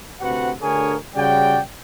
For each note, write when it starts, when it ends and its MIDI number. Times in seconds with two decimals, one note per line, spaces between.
0.20 0.51 38
0.20 0.51 48
0.20 0.51 66
0.20 0.51 71
0.20 0.51 78
0.61 0.95 38
0.61 0.95 50
0.61 0.95 68
0.61 0.95 70
0.61 0.95 73
0.61 0.95 80
1.15 1.59 49
1.15 1.59 55
1.15 1.59 66
1.15 1.59 74
1.15 1.59 79